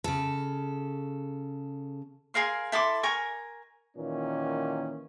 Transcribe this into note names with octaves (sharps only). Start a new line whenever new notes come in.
C#3 A4
G#4 A#4 F5 C6
E4 A4 C6 D6
A#4 G#5 C#6
A#2 D#3 E3 A#3 C#4